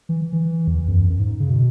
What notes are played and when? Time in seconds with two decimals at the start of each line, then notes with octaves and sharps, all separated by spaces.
0.09 E3
0.33 E3
0.68 E2
0.88 F#2
1.09 F#2
1.20 G#2
1.40 C#3
1.50 B2